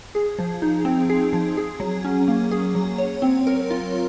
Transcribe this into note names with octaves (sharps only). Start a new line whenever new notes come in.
G#4
F3
D#4
C4
G#4
F3
G#4
F#3
C#4
A#3
G#4
F#3
C#5
C4
A#4
F4